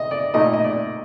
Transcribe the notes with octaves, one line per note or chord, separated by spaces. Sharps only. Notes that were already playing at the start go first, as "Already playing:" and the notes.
Already playing: D#5
D5
A#2 A3 D#4 D#5
D#5
D5